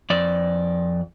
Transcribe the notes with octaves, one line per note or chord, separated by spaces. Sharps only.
F2 D5